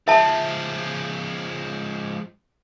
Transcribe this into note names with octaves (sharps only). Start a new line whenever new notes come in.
F3 G#3 E5 A5